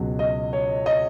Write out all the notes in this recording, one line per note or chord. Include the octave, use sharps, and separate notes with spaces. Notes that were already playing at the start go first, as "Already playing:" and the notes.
Already playing: C#2 B2 F#3
D#5
C#5
D#5